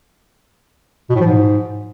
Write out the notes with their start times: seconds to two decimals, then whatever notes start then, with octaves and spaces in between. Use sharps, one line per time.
1.10 B2
1.15 A2
1.21 F3
1.26 G#2